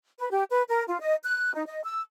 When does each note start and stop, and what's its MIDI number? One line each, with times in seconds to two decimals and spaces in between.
0.18 0.27 71
0.31 0.43 67
0.50 0.62 71
0.68 0.84 70
0.87 1.00 65
1.00 1.15 75
1.23 1.53 90
1.54 1.62 63
1.67 1.81 75
1.83 2.01 88